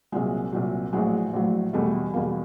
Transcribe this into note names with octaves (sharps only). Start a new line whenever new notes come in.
C2 A#2 F#3 G#3
C2 A#2 F#3
A#1 A2 F#3 G#3
A#1 A2 F#3
E2 B2 G3 A3
E2 B2 G3 A#3